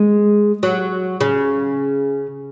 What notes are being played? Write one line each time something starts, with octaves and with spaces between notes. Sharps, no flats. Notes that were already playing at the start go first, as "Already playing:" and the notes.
Already playing: G#3
F#3
C#3